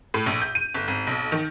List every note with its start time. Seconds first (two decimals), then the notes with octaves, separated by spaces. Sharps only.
0.14 A2
0.26 A#1
0.42 G6
0.55 D#7
0.74 G1
0.88 G#1
1.07 B1
1.32 D#3